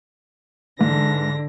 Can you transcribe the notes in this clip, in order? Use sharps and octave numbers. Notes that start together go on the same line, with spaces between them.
G#2 D3 E3 A#6